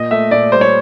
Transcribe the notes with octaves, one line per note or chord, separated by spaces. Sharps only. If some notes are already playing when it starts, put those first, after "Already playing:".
Already playing: A#2 D#5
A3 E5
A#2 D5
G3 C5
C#5